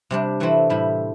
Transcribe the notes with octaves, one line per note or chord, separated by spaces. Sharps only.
C3 G3 D4
E3 A3 C4 E4
A2 G3 E4